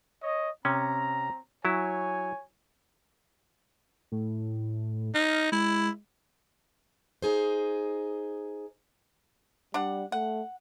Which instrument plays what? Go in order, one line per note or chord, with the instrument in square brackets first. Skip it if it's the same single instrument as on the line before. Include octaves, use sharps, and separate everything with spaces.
[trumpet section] C#5 D#5
[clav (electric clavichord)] C3 C#4 [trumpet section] C4 A#5
[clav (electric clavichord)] F#3 E4 [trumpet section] C#5 G#5
[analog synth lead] A2
[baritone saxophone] D#4 [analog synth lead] F6
[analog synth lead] G#3 [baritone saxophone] E4
[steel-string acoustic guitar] D#4 G#4 C5
[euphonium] G3 [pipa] D4 F#5
[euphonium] A3 [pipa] F#5